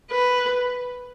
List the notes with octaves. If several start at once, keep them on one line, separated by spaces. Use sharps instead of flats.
B4